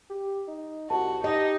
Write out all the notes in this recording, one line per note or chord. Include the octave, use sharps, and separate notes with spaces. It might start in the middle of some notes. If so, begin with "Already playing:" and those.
G4
D#4
C2 F#4 A5
D#4 G4 D#5